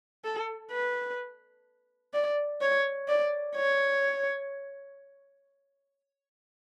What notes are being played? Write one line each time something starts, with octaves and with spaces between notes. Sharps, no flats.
A4
B4
D5
C#5
D5
C#5